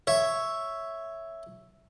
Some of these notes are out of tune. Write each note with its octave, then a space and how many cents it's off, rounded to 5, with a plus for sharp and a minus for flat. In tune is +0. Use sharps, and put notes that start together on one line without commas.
C#5 +0 E5 +0